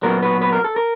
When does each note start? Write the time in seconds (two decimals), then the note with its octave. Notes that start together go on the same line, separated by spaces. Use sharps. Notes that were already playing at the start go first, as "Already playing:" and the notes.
0.03 A#2 F#3 B3 A#4
0.23 B4
0.42 B4
0.53 A#4
0.64 A4
0.76 A#4